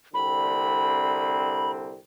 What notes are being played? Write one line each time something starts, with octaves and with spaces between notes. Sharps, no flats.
C2 D3 C4 B5